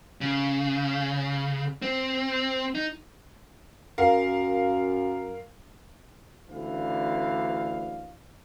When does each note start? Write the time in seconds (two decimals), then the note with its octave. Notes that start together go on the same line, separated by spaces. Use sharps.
0.21 C#3
1.82 C4
2.75 D#4
3.98 F#2 A#4 F5
6.50 A1 D2 E3 D4 F5